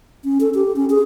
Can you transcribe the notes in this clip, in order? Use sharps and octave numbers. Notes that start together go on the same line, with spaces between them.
C#4
A4
G4
C#4
G#4